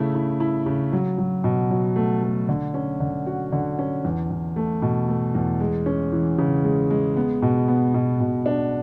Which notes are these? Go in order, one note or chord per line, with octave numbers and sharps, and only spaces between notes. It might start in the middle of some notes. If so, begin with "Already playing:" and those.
Already playing: C#3 A3 E4
E4
E4
C#3
F#3
F#3
B2
F#3
A3
A3
D3
C#4
D3
F#4
D3
C#4
E2
E2
A3
B2
A3
E2
G#3
C#4
E3
C#3
G#3
G#3
B3
B2
B3
B2
B2
D4